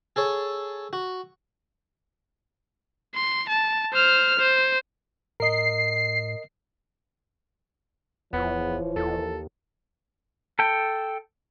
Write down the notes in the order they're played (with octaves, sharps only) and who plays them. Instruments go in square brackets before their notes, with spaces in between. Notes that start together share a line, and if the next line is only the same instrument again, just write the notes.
[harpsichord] G#4 A4 C#5
F#4
[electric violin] C6
A5
C5 F6
C5
[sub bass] A2 [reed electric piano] A#4 D#5 [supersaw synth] C7
[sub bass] D1 [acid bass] E2 [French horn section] E3 F3 C#5 [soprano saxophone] B3
[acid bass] D#2 [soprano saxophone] A4
[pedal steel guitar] A4 G5